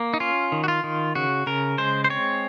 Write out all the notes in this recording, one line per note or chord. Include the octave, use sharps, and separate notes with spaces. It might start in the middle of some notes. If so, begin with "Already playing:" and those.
Already playing: A#3
D#4
C#4 F4
D#3
F#4
F4
D#3
C#3 F#4
C#3 A#4
G#3 C5
C5
C4 C#5